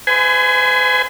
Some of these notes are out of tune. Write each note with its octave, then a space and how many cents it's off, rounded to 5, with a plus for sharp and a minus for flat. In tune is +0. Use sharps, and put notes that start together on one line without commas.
B4 +45 G#5 +5 C6 -35